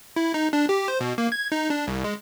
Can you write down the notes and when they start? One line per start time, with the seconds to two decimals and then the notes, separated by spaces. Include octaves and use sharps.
0.16 E4
0.34 D#4
0.53 D4
0.69 G4
0.88 C5
1.00 B2
1.18 A#3
1.32 G#6
1.52 D#4
1.70 D4
1.87 C2
2.04 G#3